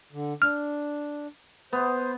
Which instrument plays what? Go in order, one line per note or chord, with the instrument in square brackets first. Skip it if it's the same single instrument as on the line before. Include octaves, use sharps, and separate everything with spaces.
[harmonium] D3
[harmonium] D4 [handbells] F6
[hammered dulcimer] B3 [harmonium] C5